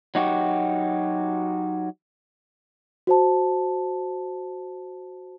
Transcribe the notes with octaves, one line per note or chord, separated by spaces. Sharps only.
F#3 D#4 F#4 G4
F#4 C5 A5